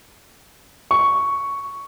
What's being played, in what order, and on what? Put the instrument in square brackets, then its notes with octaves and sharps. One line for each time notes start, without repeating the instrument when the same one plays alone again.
[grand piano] C#6